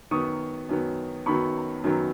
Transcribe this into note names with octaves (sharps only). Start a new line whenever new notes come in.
F#2 D#3 F#3 B3 C#6 D#6
F#2 D#3 F#3 B3
F#2 D#3 F#3 B3 B5 C#6
F#2 D#3 F#3 B3